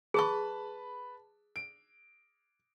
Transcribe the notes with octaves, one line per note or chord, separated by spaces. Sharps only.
G#4 B4 A5 B5 C#6
D7